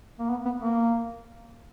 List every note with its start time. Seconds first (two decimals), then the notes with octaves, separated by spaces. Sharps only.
0.19 A#3
0.30 B3
0.45 B3
0.61 A#3